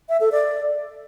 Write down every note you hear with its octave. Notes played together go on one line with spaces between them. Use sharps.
E5
A4
D5